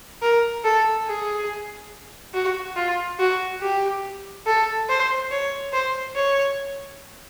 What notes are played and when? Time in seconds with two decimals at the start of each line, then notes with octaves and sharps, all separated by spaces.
0.22 A#4
0.64 A4
1.07 G#4
2.34 F#4
2.76 F4
3.19 F#4
3.61 G4
4.46 A4
4.89 C5
5.31 C#5
5.73 C5
6.16 C#5